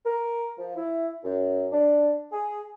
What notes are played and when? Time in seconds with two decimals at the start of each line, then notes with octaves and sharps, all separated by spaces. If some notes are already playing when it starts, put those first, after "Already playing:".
0.05 A#4
0.58 F3
0.75 E4
1.24 F#2
1.72 D4
2.32 G#4